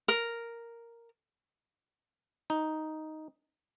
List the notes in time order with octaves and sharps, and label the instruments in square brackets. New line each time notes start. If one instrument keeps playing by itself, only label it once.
[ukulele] A#4
[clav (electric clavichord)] D#4